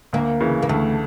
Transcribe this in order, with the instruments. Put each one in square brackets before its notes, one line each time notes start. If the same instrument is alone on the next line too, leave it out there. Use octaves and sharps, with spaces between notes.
[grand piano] D2 [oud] A#3
[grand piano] C#3 E3
[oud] A#3
[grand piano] D2 [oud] A3